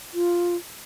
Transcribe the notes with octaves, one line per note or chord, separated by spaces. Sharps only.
F4